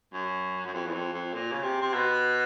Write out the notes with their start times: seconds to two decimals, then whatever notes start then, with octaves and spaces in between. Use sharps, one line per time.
0.13 F#2
0.66 F#2
0.74 F2
0.87 E2
0.94 F2
1.13 F2
1.34 A#2
1.52 C#3
1.63 C3
1.82 C3
1.93 B2